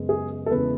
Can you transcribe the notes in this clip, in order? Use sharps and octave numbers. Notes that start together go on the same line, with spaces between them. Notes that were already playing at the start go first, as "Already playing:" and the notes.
Already playing: F#2 C#3 G#3 B3
G#4
A4
E2 C#3 G#3 B4